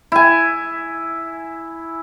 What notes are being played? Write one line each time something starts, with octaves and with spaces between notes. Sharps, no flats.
E4 G#5